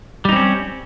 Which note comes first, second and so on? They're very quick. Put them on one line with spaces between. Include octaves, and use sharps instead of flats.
G3 D#4 C4 C#4